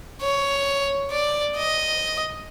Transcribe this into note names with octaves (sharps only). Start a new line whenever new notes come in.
C#5
D5
D#5